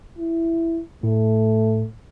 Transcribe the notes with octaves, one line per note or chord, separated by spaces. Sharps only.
E4
A2 A3